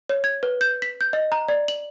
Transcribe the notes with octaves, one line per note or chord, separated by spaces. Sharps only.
C#5
G#6
B4
G6
B6
G6
D#5
A#5
D5
F#7